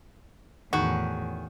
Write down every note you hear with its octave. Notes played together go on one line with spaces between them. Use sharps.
E2 A2 D#3 F#4 G#4